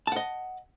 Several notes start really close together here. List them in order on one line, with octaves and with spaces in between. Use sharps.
A5 F#5 D#5